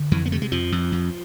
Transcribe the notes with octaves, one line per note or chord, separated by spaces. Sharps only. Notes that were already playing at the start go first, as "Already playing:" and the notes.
Already playing: D3
F2 E3
B3
C3 A3
G#3
F2 F3
F2
F2